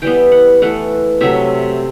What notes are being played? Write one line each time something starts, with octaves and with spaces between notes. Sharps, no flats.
E3 G3 B3 G5
F#5
E3 A3 F#5
C3 F#3 A3 E5